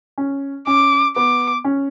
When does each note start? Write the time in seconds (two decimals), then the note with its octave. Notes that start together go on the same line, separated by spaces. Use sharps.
0.18 C#4
0.67 C#4 D6
1.16 B3 D6
1.65 C#4